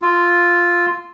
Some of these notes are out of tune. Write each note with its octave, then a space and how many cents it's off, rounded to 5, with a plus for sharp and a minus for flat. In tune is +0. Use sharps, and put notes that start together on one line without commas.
F4 +0 E6 +0